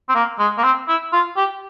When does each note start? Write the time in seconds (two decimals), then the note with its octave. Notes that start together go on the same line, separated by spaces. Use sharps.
0.09 C4
0.15 A#3
0.39 G#3
0.58 A#3
0.64 C4
0.88 E4
1.13 F4
1.37 G4